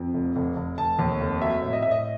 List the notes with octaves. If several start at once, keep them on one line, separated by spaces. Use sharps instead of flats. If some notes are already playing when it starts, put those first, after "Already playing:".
Already playing: F2
F1
F1
F1
F1 A5
D#2
F1
F#3 E5
A2
D#5
A2 E5
D#5